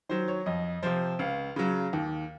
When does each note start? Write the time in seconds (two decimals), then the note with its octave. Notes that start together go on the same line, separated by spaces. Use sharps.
0.09 D#3 F#3 C5
0.28 C#5
0.46 F2 D#5
0.83 C3 F3 C5
1.19 C#2 F5
1.56 C#3 F#3
1.93 D#2